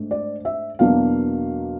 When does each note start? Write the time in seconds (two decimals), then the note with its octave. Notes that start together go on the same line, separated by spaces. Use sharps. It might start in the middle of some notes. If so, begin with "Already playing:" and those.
Already playing: G#2 A3 D4
0.11 D5
0.45 E5
0.79 E2 B2 F#3 A#3 D4 F5